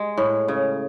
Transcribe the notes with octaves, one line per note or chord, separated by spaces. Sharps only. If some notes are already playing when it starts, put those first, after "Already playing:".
Already playing: G#3
A2
C#3